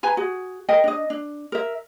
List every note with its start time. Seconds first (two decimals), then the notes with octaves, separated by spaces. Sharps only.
0.03 B4 G#5 A#5
0.17 F#4 G#4
0.69 A#4 D#5 G5
0.84 D4 D#5
1.10 D4
1.52 A#4 E5